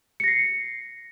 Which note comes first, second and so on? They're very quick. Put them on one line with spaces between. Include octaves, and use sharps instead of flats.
C#7 A#6 C7